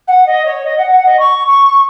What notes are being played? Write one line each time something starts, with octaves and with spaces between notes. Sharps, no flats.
F#5
D#5
C#5
D#5
F#5
F#5
D#5
C#6
C#6